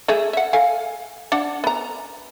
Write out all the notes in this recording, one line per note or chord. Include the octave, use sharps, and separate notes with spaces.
A3 G#4 E5
E5 F#5
A4 F5 G#5
D4 F#5
B3 A#5